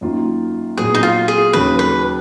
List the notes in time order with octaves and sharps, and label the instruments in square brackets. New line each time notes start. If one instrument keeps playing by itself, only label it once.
[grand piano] F#2 D#3 A#3 F4
[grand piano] A#2 F#3 B3 [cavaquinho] G#4
[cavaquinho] D#4
F4
G#4
[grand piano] D#2 C#3 F#3 [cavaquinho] B4
[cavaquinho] B4